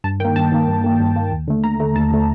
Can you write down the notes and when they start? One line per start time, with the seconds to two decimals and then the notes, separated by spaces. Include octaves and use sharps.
0.04 G2 A5
0.20 D#3 G5
0.25 A#3
0.36 G2 A5
0.52 D#3 A#3
0.68 G2
0.84 D#3 A#3
1.00 G2
1.15 D#3 A#3
1.32 D#2
1.47 D3 A3
1.64 D#2 A#5
1.80 D3 A3
1.96 D#2 A5
2.12 D3 A3